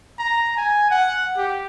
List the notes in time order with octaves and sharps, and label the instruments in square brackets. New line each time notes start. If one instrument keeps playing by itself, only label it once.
[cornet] A#5
G#5
F#5
G4